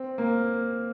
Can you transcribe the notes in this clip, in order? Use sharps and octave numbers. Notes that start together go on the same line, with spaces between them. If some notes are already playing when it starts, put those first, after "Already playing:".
Already playing: C4
A#3